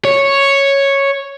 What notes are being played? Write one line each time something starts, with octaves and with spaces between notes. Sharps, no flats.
C#5